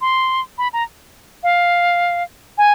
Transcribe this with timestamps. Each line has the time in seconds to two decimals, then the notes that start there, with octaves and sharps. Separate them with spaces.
0.01 C6
0.58 B5
0.73 A#5
1.43 F5
2.58 G#5